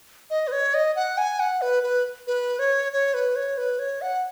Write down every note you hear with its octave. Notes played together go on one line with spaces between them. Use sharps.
D#5
B4
C#5
D#5
F#5
G#5
F#5
B4
B4
B4
C#5
C#5
B4
C#5
B4
C#5
F#5